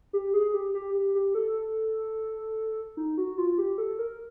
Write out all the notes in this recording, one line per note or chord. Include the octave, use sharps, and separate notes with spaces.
G4
G#4
G4
G4
G4
G4
A4
D#4
F#4
F4
G4
A4
A#4